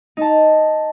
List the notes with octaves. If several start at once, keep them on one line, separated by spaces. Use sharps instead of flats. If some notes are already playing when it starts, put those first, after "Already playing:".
D#4 A5